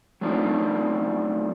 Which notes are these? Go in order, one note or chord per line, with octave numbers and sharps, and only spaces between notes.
F#3 A3 C4 D4 D#4 F4